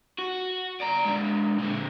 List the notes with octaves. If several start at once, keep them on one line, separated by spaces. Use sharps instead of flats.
F#4
D5 A#5
G#3 D4
A#2 D3